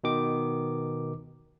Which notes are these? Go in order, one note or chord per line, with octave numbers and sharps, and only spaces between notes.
B2 D#3 D6